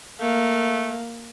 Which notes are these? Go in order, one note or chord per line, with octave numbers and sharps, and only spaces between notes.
A3 A#3 F5